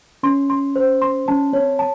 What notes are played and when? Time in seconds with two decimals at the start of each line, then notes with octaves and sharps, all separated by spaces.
0.23 C#4 C6
0.50 C6
0.76 C5
1.02 C6
1.28 C#4 A5
1.53 C4 C#5
1.79 A5